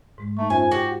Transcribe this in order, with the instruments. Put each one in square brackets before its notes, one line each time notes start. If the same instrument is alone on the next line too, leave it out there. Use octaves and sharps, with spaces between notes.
[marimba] G#2 G#3
[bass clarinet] A3 [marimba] D#4 A#5 C#6
[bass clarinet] F#2 [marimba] F4 C5 [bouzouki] G#5
[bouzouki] F#4 [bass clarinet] G4